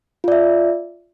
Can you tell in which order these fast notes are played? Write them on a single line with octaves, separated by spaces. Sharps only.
F4 D5 E5